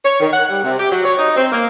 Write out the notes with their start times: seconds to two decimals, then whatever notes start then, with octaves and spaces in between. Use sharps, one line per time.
0.05 C#5
0.21 D#3
0.33 F#5
0.50 G3
0.64 C3
0.79 G4
0.91 F#3
1.04 C#5
1.18 D#4
1.36 C4
1.52 A#3